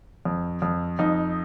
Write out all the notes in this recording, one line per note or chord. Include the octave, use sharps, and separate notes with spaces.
F2
F2
F2 D#4